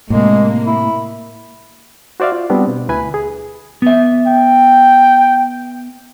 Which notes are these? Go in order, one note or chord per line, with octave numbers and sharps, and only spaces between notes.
A2 C3 G#3 A#3
E4
F#4 C5 D5 E5 F5
F4
G3 B3 C4 D4
B2
D2 E4 B4 G#5 B5
G#4
B3 E5
G5